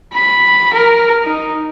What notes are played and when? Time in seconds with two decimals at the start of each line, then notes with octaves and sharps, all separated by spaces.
0.14 B5
0.74 A#4
1.24 D#4